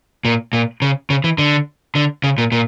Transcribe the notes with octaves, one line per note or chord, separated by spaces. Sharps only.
A#2
A#2
C#3
C#3
E3
D3
D3
C#3
A#2
A#2